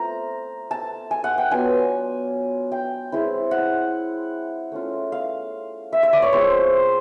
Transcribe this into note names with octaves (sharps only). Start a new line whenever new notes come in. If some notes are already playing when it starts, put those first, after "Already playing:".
Already playing: A3 C4 F4 A#5
A5
G#5
F#5
G5
F#3 B3 D4 F4 G#5
G5
G#3 C4 E4
F#5
A3 C#4 F4
F5
E5
E5
D5
C#5
F3 G#3 C4 C5